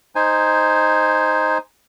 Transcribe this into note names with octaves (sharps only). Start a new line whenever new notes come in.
D#4 C5 G#5